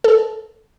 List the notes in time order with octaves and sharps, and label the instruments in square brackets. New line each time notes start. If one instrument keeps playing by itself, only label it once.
[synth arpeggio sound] A4